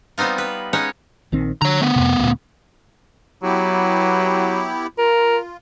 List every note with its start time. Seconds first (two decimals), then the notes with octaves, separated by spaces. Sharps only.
0.18 G3 B3 C4 D#4 F4
0.38 B4
0.73 G#3 C#4 D#4 G#4 C#5 F#5
1.32 A#1 D#3 C4
1.62 D3 C#5 A#5
1.81 A3 B3
1.96 F2 C3
2.19 D2 A#2
3.43 F#3 B3 E4 G4
4.98 F4 A#4